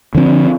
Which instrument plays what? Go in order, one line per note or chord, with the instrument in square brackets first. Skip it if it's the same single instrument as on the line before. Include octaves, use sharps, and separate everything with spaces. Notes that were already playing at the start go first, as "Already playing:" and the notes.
[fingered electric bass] D3 F3 A3 C4